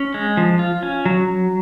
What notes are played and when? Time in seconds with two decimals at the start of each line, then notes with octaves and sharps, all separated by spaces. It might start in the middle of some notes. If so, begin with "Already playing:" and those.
Already playing: C#4
0.14 G#3
0.37 F3
0.59 F4
0.83 C#4
1.05 F#3